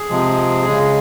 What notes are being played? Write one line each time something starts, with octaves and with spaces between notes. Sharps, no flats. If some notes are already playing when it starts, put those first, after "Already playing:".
Already playing: G#4
C3 F3 G#3
C#3 G#3